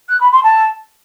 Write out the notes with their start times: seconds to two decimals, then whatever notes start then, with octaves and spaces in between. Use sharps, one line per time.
0.09 F#6
0.20 B5
0.32 C6
0.43 A5